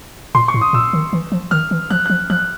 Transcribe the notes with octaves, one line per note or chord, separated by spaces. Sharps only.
A#2 C6
C#6
A2
D#6
A#2 E6
D#3
E3
F3
D#3 F6
E3
F3 F#6
F3 F#6
F3 F#6